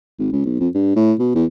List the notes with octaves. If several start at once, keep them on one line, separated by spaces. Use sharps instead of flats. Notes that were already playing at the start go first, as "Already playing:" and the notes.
G#1
C#2
B1
F2
G2
A2
B2
E2